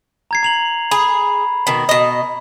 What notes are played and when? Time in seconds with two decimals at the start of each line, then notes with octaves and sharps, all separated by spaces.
0.31 A#5 G#6 C7
0.43 A#5 F7 F#7
0.91 G#4 B5
1.67 B2 D#3
1.89 B2 D#5